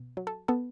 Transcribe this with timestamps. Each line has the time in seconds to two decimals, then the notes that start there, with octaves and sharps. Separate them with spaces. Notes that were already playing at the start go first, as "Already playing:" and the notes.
Already playing: B2
0.17 F#3
0.27 A4
0.48 B3 A4